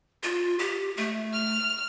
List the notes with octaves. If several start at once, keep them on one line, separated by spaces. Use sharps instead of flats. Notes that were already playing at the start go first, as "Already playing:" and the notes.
F4
G4
A3
F6